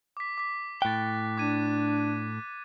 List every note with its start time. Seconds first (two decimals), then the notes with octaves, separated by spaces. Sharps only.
0.17 D6 B6
0.38 D6 B6
0.82 A2 G5 F#6 A6
1.38 D4 D6 G#6 D#7